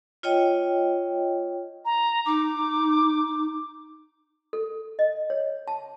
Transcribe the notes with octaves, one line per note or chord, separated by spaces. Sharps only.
F4 C#5 D#5 G5
A#5
D#4 D6
A4
D#5
C#5
A5